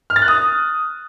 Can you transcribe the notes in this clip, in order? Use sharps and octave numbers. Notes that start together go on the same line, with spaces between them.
F6
A6
F#6
D#6